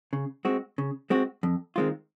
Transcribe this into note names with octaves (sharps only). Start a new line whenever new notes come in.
C#3
G#3 C4 F#4
C#3
G#3 C4 F#4
F2
D#3 G#3 C4 F4